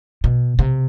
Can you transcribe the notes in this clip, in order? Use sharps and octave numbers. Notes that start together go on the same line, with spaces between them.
B2
C3